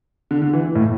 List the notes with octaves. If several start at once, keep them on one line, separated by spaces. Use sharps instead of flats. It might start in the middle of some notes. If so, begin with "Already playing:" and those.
D3
D3
E3
A2